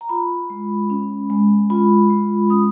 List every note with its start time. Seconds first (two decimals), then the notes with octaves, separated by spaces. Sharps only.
0.01 A#5
0.09 F4 B5
0.50 G#3
0.90 C#4
1.30 G#3
1.70 F4 B5
2.10 G#3
2.50 C#4 D#6